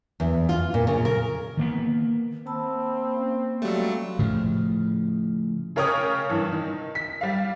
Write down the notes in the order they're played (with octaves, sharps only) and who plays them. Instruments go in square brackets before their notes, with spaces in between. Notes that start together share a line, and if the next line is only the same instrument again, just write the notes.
[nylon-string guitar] E2
F4
A#2
C#3
A#4
[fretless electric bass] D#3 A#3 B3
[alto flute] A#3 [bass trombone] C4 [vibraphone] A5 B5 E6
[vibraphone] C#4
[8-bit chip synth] F#3 A3 [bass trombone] G3 [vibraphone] F#4 F5 C6
[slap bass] A2 C#3 F3
[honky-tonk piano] C#3 A#4 C#5 G5 D#6
G2 E3
D#3
B6
G3 F5